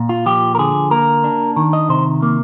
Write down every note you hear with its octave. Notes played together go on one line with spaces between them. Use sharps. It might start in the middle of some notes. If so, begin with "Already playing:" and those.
Already playing: A#2
F4
F3 G4
A#4
D3 G#4
A#3 A#4
D4
D#3
D#5
C3 C5
A#3